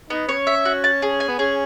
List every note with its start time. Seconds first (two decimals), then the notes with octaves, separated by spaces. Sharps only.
0.10 B3 D#4
0.28 C#4 C#5
0.47 E5
0.65 F#4
0.84 A5
1.02 G#4
1.20 G#5
1.28 B3
1.39 C#4 G#4